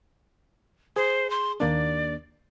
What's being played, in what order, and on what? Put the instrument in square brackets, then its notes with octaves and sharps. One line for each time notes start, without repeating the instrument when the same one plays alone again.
[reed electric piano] G#4 [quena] C5
[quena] C6
[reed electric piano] D#2 A#3 D4 [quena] D5